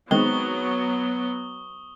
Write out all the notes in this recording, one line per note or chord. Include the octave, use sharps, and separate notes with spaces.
D#3 F#3 G#3 B3 C4 C#6 D#6 G7